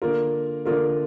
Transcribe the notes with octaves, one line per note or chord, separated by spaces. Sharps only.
D3 A#3 F4 A#4
D3 A#3 F4 A#4